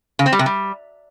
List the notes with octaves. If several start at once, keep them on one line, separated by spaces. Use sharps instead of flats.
C#3
C4
G3
C3
G3